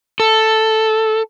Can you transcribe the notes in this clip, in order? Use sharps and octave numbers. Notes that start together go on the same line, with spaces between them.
A4